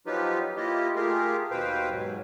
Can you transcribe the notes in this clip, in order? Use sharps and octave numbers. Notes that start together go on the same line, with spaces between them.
F3 F#3 D#4 F4 G4 B4
A#3 E4 F4 G4 D#5
A3 F4 G4 G#4 A#4
D#2 B2 B4 C5 F5 G5
G#2 F#3